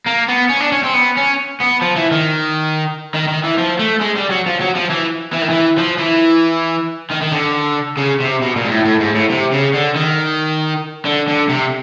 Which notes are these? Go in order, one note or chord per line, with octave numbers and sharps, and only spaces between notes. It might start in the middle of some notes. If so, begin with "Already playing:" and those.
A#3
B3
C#4
D4
C#4
C4
B3
C#4
B3
F3
E3
D#3
D#3
D#3
E3
F3
A3
G#3
G3
F#3
F3
F#3
F3
E3
E3
D#3
E3
F3
E3
D#3
D#3
D3
C#3
C3
B2
A#2
G#2
A2
A2
G#2
A2
C3
C#3
D3
D#3
D3
D3
C3